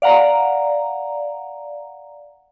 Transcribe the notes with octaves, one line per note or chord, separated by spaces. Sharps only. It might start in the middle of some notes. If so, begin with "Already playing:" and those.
D5 F5 F#5 A#5